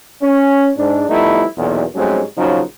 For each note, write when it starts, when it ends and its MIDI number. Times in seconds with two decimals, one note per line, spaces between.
0.22 0.70 61
0.77 1.08 44
0.77 1.08 62
1.09 1.44 53
1.09 1.44 55
1.09 1.44 57
1.09 1.44 59
1.09 1.44 63
1.09 1.44 64
1.57 1.83 35
1.57 1.83 40
1.57 1.83 46
1.95 2.22 44
1.95 2.22 54
1.95 2.22 55
1.95 2.22 57
1.95 2.22 60
1.95 2.22 61
2.37 2.62 34
2.37 2.62 49
2.37 2.62 53
2.37 2.62 54
2.37 2.62 63